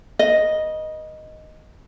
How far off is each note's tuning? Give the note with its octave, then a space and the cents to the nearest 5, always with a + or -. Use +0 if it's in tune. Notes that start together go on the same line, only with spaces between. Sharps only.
B4 -40 D#5 +0